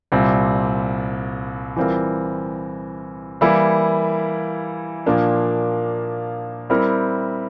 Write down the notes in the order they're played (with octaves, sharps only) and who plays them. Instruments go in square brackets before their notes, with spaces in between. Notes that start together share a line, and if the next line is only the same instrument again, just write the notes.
[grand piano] C2 A#2 G3 C4
E3 G3 C4 F4 A#4
E3 G3 A#3 E4
A#2 F3 A#3 D4
G3 C4 E4 A#4